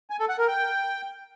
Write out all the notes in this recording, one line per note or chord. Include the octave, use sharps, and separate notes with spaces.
G#5
A4
F#5
A#4
G5